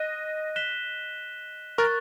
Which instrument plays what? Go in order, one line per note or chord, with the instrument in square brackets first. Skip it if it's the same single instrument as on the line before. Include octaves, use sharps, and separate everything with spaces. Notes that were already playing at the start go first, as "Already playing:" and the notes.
Already playing: [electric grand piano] D#5 [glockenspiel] F#6 A#6 D#7
[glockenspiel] F#6 B6 E7 G7
[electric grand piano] A#4 [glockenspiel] C#6 F#6 A6